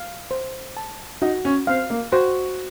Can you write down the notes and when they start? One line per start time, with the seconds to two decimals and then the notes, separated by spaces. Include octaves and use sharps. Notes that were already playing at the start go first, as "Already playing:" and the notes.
Already playing: F5
0.31 C5
0.77 A5
1.22 D#4 F#4
1.45 C#4
1.67 C4 F5
1.90 A#3
2.12 F#4 C5